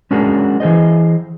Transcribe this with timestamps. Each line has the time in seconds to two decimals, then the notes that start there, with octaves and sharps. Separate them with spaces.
0.11 G#3 C#4 D4 F#4 G#4 A#4
0.60 E3 G#4 C5 D#5